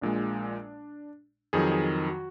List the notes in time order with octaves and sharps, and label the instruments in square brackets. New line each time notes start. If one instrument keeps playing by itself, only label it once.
[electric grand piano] A#1 A#2 G#3 D4
F2 D#3 F#3 G#4
G#4
F#4